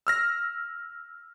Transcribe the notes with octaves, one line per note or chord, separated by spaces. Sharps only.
E6 F6 A#6